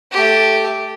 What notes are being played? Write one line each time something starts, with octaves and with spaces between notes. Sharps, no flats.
A3 G4